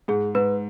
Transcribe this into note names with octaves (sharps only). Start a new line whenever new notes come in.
G#2 G#4
G#2 B4